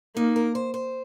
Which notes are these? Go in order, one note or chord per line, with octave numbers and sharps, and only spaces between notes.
A#3 D#4
A#4
C5
C5